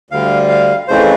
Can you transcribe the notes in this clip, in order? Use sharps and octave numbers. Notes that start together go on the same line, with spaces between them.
D2 D3 G3 F5
F5
F2 C#3 E3 A3 C5